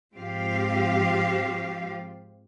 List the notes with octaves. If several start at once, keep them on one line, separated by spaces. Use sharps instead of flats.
G#2 F3 C4 F4 G4 F5